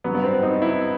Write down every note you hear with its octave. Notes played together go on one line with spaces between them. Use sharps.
G2 F#3 B3
B3
C4
D#4
E4